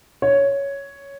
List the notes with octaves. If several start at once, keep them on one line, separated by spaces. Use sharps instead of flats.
C#5